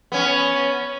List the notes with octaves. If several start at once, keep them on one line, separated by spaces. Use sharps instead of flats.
B3 C#4